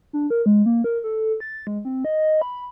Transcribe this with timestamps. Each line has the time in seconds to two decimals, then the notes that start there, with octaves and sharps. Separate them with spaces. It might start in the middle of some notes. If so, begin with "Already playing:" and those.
0.13 D4
0.30 A#4
0.46 G#3
0.66 A#3
0.84 A#4
1.04 A4
1.40 A6
1.67 G#3
1.85 C4
2.05 D#5
2.42 B5